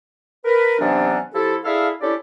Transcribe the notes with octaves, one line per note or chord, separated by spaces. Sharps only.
A#4 B4
C3 E3 F#3 B3 C#4 D4
F3 E4 G4 A4
D4 E4 G#4 A4 E5 F5
C#4 D4 E4 G4 A4 D5